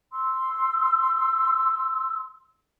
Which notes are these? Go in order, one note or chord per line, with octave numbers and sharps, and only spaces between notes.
C6 E6